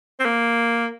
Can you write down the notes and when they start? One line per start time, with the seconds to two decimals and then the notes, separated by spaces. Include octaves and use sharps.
0.20 C4
0.25 A#3